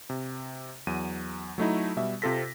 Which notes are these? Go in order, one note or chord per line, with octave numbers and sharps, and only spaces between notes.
C3
E2 F#3 D#7
F#3 A3 D#4 E4
B2 G3 E5
C3 C4 F4 A4 A#6 B6